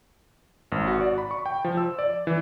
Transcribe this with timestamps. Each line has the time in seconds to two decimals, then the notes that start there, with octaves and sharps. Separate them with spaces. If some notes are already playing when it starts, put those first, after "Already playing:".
0.72 G#1
0.87 F#4
1.01 D5
1.18 B5
1.31 C#6
1.46 G5
1.64 F3
1.77 E6
1.99 D5
2.27 E3